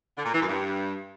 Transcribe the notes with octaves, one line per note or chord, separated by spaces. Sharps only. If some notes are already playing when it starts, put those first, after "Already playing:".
D3
A#2
E3
F#2
G2